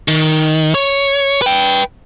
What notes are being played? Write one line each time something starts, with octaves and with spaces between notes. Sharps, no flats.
D#3
C#5
B4 G5